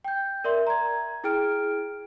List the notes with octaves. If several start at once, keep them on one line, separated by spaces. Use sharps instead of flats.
G5 G6
A#4 D5 E5 C6
A#5 G#6
E4 G#4 G5 F6 D7